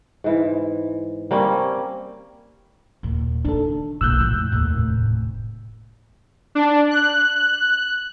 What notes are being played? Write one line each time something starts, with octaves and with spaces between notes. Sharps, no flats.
G#2 E3
G3 A#3 C4 C#4
D#2 A#2
D#3 D4 A4
B1 A#2 E6 F#6 G6
F2 A2
F1 D#2
A2
D4
F#6